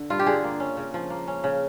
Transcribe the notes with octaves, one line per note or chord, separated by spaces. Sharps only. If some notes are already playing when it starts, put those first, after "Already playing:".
Already playing: D3
G2 F4
G4
D3 G#4
A#3
C#4
C#3
F3
A#3
C#4
C#3